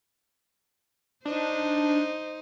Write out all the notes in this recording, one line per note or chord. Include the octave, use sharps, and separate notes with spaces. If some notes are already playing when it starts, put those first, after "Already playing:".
D4 D#4 C5